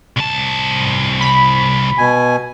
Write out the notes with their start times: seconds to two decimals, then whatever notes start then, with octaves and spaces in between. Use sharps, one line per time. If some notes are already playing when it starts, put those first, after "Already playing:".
0.17 C2 A5
1.21 B5
1.98 B2 G#5